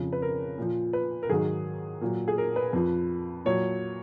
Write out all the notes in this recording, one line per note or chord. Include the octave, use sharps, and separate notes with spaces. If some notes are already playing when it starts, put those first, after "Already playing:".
Already playing: F2 C#3 F3
B4
A#4
A#2 F3
B4
A#4
G#2 D#3 F#3 G#4
A#2 F#3
G#4
A#4
B4
F2 F3
A#2 F#3 C#5